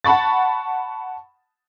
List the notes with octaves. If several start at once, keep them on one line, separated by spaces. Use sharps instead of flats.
F#5 A5 B5 C#6 A6